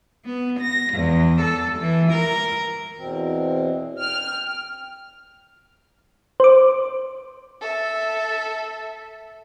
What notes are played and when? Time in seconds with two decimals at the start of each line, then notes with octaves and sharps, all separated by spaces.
0.24 B3
0.60 A#6
0.95 E2
1.41 A4
1.78 E3
2.12 A#4
2.97 E2 B2 C4
4.00 G5 F6
6.40 C5 D6
7.63 A4 E5